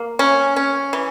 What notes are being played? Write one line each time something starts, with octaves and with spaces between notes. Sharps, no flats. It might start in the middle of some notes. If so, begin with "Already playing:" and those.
Already playing: A#3
C#4
C#4
E3